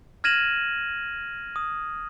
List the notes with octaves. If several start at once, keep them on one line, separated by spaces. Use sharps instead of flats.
F6 G#6 A#6 D#7 E7 F#7
D#6